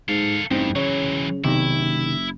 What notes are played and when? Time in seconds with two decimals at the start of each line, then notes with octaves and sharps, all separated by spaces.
0.09 G#2 A4 F5
0.51 A1 G2 C4 D#4
0.76 C#3 E3 F#3 C#5
1.44 B1 C3 D#3 E4
1.79 F#1